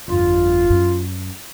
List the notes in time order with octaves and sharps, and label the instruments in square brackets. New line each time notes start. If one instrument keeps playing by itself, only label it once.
[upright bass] G1 F2 [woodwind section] F4
[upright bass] F#2